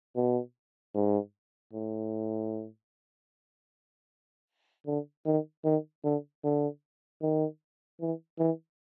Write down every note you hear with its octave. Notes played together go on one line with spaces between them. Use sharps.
B2
G#2
A2
D3
D#3
D#3
D3
D3
D#3
E3
E3